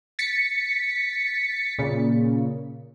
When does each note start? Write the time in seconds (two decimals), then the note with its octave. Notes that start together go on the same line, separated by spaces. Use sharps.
0.19 A6 B6 C#7
1.78 A#2 C#3